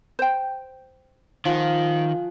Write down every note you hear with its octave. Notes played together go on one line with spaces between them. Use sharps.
C5 G5
D#3 F3 F#5 G#5